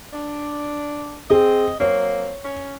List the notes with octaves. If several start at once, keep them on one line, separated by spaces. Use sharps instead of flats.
D4
C4 G#4 D#5
F#3 A#3 C4 C#5
C#4